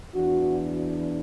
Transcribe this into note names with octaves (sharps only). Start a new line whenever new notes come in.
E2 E3 D4 F#4